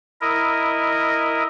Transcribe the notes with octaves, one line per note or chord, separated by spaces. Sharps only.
E4 A#4 D#5